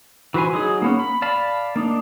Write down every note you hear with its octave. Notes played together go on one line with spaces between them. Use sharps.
E3 F#4 B4 C5 G#5
F#3 D#4 G#4
A#3 B3 C#4
B5
D5 F5 A5 B5
A#3 D4 D#4